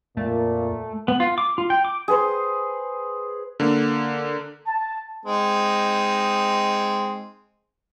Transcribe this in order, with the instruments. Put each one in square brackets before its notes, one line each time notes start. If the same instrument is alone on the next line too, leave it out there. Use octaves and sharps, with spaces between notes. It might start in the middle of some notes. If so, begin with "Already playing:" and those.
[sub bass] F2 [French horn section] A#2 [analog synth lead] A3
[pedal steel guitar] B3
F4
D6
F4
G5
D6
[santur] G#4 B4 C5
[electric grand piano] D3 A#3
[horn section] A5
[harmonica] G#3 C4 D#4